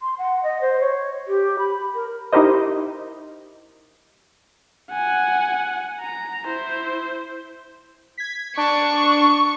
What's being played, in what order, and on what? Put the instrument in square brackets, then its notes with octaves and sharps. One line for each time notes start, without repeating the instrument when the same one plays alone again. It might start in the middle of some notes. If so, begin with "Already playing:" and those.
[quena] C6
F#5
D#5
C5
C#5
G4
B5
A#4
[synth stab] D#4 E4 G4 A#4 C5 D#5
[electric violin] F#5 G#5
A#5
E4 C5
[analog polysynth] G#6 B6
[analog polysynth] D4 [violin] C#6